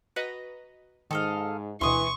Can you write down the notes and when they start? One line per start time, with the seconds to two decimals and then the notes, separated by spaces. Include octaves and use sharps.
0.16 F#4 B4 D#5 A#5
1.11 G#2 D#3 A4 D#5 F5
1.81 D2 B2 E3 C6 C#6 D#6